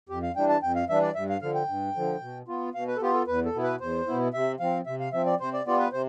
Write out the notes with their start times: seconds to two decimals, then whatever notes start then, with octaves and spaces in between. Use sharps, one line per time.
0.09 F2 G4
0.23 F5
0.36 E3 G3 D4 G5
0.49 A5
0.63 F2 G5
0.76 F5
0.89 E3 G3 D4 E5
1.02 D5
1.15 G2 E5
1.29 F5
1.42 D3 F3 F5
1.55 G5
1.68 G2
1.96 D3 F3
2.21 B2
2.48 B3 F4
2.74 B2 F5
2.88 B4
2.97 A4
3.01 B3 F4 G4
3.14 A4
3.27 E2 B4
3.45 A4
3.55 B2 B3 E4
3.63 B4
3.80 E2 C5
4.07 B2 B3 E4
4.34 C3 E5
4.60 F3 C4 F5
4.86 C3 E5
5.00 F5
5.13 F3 C4 E5
5.26 D5
5.40 C3 C5
5.53 D5
5.66 G3 B3 F4 D5
5.79 B4
5.93 C3 C5